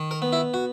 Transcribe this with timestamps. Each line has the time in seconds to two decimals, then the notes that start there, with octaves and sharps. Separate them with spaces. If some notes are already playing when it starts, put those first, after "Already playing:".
Already playing: D#3
0.11 A#4
0.22 B3
0.33 E4
0.54 F#4